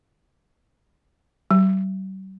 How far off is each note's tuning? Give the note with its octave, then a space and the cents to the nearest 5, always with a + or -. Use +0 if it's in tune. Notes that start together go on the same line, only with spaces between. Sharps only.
G3 -45